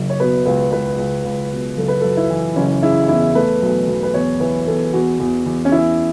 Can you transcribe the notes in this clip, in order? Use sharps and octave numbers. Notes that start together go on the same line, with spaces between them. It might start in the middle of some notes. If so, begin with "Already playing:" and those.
Already playing: F#1
C#5
B2 B4
C#2 B4
C#2 B4
C#2
C#2
B2
F#1 A4
B4
F#2 A4
E4
E3
F#1 C#4
C#3 E4
E2 E4
A3 B4
B1
B1
B4
E2 C#5
E3 B4
E2 A4
E2 F#4
E2
E2
C#4
E2 E4